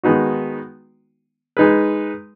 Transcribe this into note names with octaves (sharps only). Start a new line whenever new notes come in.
D#3 G#3 B3 D#4 F#4
G#3 D#4 G#4 B4